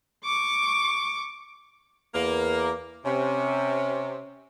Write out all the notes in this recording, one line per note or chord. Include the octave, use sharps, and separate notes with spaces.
C#6 D6
E2 A#3
C3 C#4